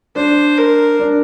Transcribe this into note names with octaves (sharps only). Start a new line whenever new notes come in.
D4 C5
A#4
D4